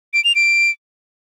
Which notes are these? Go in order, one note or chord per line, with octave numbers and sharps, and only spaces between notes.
D7
F7
D7